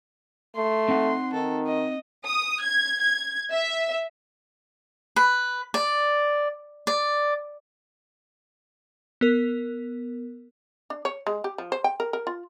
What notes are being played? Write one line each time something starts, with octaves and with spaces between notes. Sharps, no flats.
A3 C6
C4 D#4 F#5
D#3 A4
D#5
D#6
G#6
G#6
E5
B4
D5
D5
B3 A#4
D4
C#5
G#3
G4
F3
C5
G5
A#4
A#4
F4